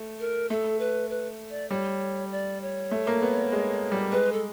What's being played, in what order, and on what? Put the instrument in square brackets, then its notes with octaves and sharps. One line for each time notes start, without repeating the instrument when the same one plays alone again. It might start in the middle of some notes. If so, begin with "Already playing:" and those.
Already playing: [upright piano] A3
[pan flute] A#4
[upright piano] A3 [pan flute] A4
[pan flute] B4
B4
D5
[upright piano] G3 [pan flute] C#5
[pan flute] D5
C#5
[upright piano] A3
A#3
B3
G#3
G3
[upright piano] G#3 [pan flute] B4
[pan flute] A4